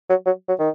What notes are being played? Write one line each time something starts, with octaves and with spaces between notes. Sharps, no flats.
F#3
F#3
F#3
D#3